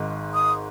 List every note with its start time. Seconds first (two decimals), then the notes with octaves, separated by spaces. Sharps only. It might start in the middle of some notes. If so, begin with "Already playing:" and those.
Already playing: G#1 G#2 G#3
0.34 D#6